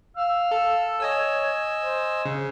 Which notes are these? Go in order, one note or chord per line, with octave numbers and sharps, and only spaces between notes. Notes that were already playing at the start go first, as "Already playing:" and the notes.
F5 E6
A4
C#5 D#5 G#5 E6
C5
C#3